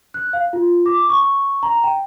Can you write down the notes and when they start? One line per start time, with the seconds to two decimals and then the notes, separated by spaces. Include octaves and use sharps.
0.14 F#6
0.33 F5
0.53 F4
0.86 D6
1.09 C#6
1.63 A#5
1.84 G5